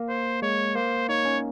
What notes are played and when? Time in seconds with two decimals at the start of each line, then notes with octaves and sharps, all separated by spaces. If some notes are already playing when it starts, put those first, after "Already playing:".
Already playing: A#3
0.09 C5
0.42 G#3 C#5
0.75 A#3 C5
1.09 D#4 C#5
1.25 C#4